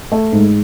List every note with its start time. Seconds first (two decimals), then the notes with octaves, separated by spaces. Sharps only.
0.12 A3
0.33 G#2